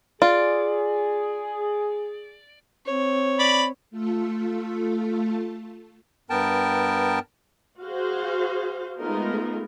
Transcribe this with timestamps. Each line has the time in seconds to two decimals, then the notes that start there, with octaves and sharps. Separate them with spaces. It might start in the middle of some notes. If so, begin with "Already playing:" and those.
0.22 F4 G#4 D5
2.85 C4 C#5
3.39 D5 B5
3.91 A3 F4 A4
6.30 G2 B3 A#4 G5 A5
7.83 F#4 G#4 C5 F5
8.99 G#3 A3 B3 D#4 F4 A#4